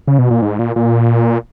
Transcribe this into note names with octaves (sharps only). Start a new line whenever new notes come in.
C#3
B2
A#2
G#2
A#2
A#2